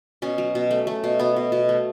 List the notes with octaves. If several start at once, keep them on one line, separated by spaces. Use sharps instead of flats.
B2 C#4
F#3
B2
A3
A3
B2
B2 B3
B2
B2
A3